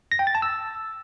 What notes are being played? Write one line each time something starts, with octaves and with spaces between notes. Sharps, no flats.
A#6
G5
A6
A5
E6